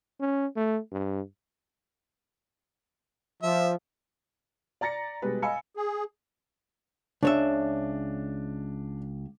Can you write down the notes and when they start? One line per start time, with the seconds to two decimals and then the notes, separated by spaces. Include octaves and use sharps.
0.20 C#4
0.57 A3
0.92 G2
3.43 F3 E5
4.81 D5 A#5 A6 A#6 C#7
5.22 B2 G3 G#3 B4
5.42 D#5 F5 G#5 B5 E6 C#7
5.77 G#4
7.23 C#2 D4 C#5 E5